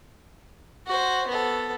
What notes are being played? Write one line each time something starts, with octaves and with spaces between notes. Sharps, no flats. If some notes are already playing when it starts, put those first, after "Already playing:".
F#4 C5
B3 A4